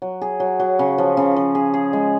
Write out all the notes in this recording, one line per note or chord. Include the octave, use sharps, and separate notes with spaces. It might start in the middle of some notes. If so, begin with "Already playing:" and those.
F#3
G#4
F#3
F#3
C#3
F3
C#3
F3
G#4
G#4
G#3